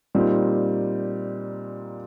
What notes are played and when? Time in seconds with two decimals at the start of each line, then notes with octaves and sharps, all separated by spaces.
0.15 A#2 G3 C4 D#4